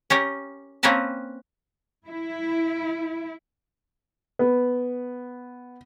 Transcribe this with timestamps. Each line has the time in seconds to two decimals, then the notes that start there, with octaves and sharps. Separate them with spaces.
0.10 C#4 G4 A#4
0.83 A#3 C4 C#4 A#4 B4 A5
2.07 E4
4.39 B3